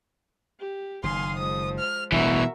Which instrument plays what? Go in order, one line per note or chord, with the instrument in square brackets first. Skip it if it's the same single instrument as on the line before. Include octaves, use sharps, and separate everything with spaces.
[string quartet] G4
[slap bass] F#1 D#3 [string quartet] F5 G#5 D#6 [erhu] C6
[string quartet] F3 G#3 [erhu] D#6
[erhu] F6
[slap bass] E1 A1 G3 [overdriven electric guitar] B2 E3 [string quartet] F#4 A#4 [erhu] E5